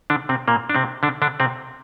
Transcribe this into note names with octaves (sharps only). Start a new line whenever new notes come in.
D3 D4
C3 C4
A#2 A#3
D4
C3 C4
D3 D4
D3 D4
C3 C4